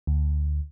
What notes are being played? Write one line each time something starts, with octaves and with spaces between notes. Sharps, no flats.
D2